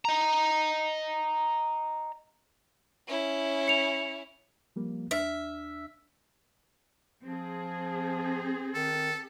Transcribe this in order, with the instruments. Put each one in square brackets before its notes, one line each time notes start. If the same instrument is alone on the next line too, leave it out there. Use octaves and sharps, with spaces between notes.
[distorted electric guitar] D#5 A#5
[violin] C#4 E4
[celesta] C#7 F7
[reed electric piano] F3 G3 A#3
[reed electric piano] D#2 D4 F6 [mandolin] E5
[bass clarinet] F3 [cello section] C4 G#4
[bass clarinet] D#3 [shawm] A4